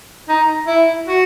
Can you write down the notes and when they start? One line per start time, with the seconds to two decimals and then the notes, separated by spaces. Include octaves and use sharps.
0.29 D#4
0.67 E4
1.07 F#4